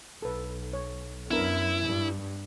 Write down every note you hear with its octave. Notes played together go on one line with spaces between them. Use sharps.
B1 A4 B4
C#5
F#2 F#3 B3 D4 E4 A#4
G2